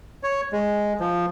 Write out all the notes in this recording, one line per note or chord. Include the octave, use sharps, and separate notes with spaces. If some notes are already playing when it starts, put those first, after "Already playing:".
C#5
G#3
F3